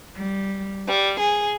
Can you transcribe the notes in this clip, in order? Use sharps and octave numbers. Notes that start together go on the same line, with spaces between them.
G3
G3
G#4